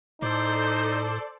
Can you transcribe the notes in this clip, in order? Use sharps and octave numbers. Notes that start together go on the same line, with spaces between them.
A2 D#4 A4 C5 D5